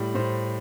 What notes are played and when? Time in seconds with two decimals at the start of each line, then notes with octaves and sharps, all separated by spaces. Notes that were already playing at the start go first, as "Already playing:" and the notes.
Already playing: A2 G3
0.15 A2 C5